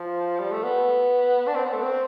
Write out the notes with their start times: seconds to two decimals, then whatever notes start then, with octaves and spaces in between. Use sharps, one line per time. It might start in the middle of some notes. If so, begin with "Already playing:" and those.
Already playing: F3
0.40 G3
0.52 A3
0.64 B3
1.47 D4
1.55 C4
1.65 B3
1.73 A3
1.82 C4